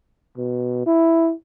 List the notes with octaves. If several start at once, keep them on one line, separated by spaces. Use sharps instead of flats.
B2
E4